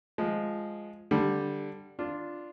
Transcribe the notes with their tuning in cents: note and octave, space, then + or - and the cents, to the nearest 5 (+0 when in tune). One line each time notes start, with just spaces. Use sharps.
F3 +0 G#3 +0
D3 +0 G3 +0
D4 +0 F4 -5